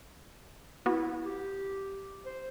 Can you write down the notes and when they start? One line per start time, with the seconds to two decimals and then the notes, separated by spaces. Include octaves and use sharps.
0.86 B3 E4 F#4
1.24 G4
2.26 C5